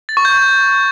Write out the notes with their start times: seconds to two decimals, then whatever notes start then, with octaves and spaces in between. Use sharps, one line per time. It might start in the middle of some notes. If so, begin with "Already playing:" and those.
0.09 A6
0.17 C#6
0.25 G6
0.33 C#6